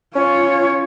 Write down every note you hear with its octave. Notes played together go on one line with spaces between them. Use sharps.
C#4 F4 C#5